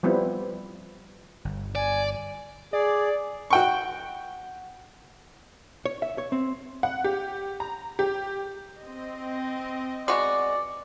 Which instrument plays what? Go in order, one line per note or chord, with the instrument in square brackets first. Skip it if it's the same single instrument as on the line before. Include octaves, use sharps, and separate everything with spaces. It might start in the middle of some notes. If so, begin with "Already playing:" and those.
[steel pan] F3 G3 B3 C4 E4
[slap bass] G1
[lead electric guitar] D5 [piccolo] G#5
[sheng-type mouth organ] G#4 [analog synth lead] D5
[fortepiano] F#4 G5 C#6
[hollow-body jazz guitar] C#5
E5
C#5
C4
[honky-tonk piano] F#5
G4
A#5
G4
[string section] C4 D#5
[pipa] G#3 B3 F#4 [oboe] D5